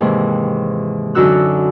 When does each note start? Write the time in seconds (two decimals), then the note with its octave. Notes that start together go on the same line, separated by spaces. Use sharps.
0.01 D#2 G#2 C3 E3
1.15 F#2 D3 D#4 F#4 E6 F#6